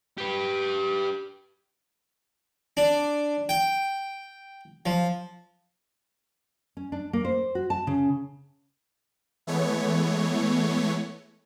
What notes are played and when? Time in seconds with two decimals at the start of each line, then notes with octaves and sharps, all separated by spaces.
0.18 G4 B4
2.77 D4
3.49 G5
4.86 F3
6.77 C#4
6.92 D4
7.13 A#3
7.25 C5
7.55 F#4
7.70 A5
7.87 C#3
9.47 E3 G#3 A3 B3 C#5